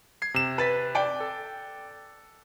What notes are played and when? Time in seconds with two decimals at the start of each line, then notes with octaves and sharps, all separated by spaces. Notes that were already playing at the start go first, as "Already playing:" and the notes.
0.22 G#6 C7
0.34 C3 E7
0.58 B4 A6 B6
0.95 D5 G5
1.20 A4